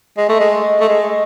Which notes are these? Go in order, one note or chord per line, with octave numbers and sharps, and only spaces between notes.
G#3
A3
G#3
A3
G#3